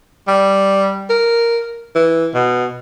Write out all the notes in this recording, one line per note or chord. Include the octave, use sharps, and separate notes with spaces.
G3
A#4
E3
B2